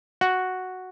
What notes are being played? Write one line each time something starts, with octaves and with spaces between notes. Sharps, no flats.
F#4